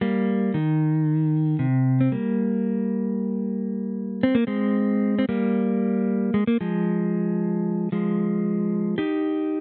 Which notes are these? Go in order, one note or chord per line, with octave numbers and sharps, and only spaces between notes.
G3 A#3
D#3
C3
C4
G3 A#3
C4
A#3
G#3 C4
C4
G3 A#3
G#3
A#3
F3 G#3
F3 G#3
D#4 G4